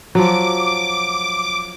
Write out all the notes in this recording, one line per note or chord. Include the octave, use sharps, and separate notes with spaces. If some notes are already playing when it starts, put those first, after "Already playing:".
F3 F#3 D6